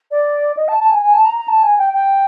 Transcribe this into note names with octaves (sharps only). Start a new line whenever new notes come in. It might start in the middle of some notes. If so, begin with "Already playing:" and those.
D5
D#5
A5
A5
G#5
G#5
A5
A#5
A#5
A5
G#5
G5
G5